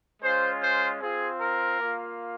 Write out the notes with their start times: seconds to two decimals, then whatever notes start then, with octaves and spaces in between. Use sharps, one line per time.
0.22 G#3 C#4 F4 C5
0.62 C5
1.01 C4 F4 G#4
1.40 A#4
1.80 A#3 F4